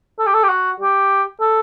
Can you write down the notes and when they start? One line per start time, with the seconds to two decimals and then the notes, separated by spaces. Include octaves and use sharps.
0.19 A4
0.27 G4
0.34 A4
0.43 G4
0.49 F#4
0.80 G4
1.40 A4